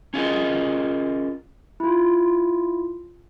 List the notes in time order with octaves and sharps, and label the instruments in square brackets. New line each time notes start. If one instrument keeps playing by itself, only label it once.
[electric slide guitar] C#4 F4 G#4 A#4 D#5
[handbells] E4 F4